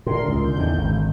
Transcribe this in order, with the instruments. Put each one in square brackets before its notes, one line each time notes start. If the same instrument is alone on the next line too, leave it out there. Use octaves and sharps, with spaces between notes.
[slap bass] A2 D3 [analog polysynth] A#4 C6
[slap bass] C#2
[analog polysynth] D3 G6
[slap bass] E2 A2 D#3
G#1